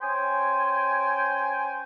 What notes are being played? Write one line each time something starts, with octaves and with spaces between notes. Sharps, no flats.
C#4 C5 G5 G#5